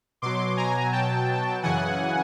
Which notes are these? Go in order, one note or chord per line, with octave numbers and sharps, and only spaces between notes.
B2 F#3 C6 D6
G#5 A#5
G5 A5
F#2 C#3 E3 F#5 G#5